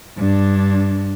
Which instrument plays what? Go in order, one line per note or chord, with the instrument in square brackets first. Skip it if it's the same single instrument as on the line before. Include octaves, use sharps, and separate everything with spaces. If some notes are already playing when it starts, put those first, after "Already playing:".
[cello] G2 D4